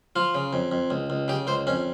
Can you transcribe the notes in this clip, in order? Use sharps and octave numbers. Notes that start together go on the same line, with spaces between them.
F3 F4
C#3
F2
F2
C#2
C#2
C#3 G4
C#2 C5
F2 C#4